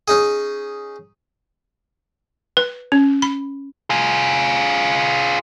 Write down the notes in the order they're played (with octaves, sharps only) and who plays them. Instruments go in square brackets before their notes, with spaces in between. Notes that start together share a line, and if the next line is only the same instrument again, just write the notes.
[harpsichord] C#4 D#4 G#4
[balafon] B4
C#4
B5
[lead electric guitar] F4 G#4